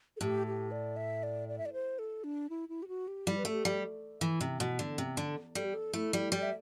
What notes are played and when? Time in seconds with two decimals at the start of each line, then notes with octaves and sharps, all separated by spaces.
0.17 A4
0.21 A2 G4
0.47 G4
0.71 D5
0.97 E5
1.23 D5
1.48 D5
1.58 E5
1.66 D5
1.73 C5
1.99 A4
2.24 D4
2.50 E4
2.69 E4
2.83 G4
2.88 F#4
3.08 G4
3.27 G3 E4
3.38 B4
3.45 A3 A4
3.51 G4
3.65 G3
4.21 E3
4.41 C3
4.60 B2
4.79 D3
4.98 C3
5.17 D3
5.55 G3 A4
5.65 G4
5.74 A4
5.93 A3 E4
6.13 G3
6.32 G3 D5
6.43 E5